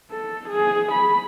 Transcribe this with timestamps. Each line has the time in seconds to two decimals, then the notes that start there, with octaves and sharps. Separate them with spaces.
0.11 A4
0.48 G#4
0.92 B5